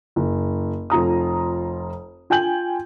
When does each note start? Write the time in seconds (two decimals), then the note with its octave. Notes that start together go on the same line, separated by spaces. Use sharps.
0.16 F#1
0.90 F1 F4 A#5 D#6
2.30 F4 G5 G#5 G6 F#7